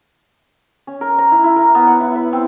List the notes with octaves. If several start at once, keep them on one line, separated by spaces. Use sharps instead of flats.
C#4
A#4
A#5
E4
E4
A#4
B3
F#5
E4
B4
C4